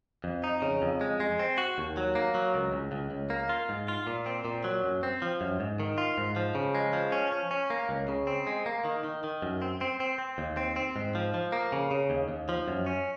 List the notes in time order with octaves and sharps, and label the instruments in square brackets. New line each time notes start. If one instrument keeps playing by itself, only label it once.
[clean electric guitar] F2
D#4
C#3
F2
G#3
G#3
C4
F#4
D#2
F#3
A#3
F#3
C#2
C#2
C#2
C#2
A#3
F4
G#2
F4
A#2
C4
A#2
F#3
F#2
C4
F3
F#2
G#2
D#3
F4
G#2
F3
C#3
G#3
F3
C#4
C#4
C#4
A#3
C#2
C#3
C4
G#3
A#3
D#3
D#3
D#3
F#2
C4
C4
C4
C4
D#2
C4
C4
G#2
F3
F3
A#3
C#3
C#3
D#2
D#2
F3
F#2
C#4